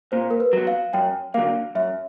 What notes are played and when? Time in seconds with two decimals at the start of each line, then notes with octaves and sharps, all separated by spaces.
0.12 A#2 C5
0.31 A#4
0.40 B4
0.53 F#3 B3
0.67 F5
0.93 F#2 G5
1.34 D3 F#3 A#3 F5
1.75 F#2 E5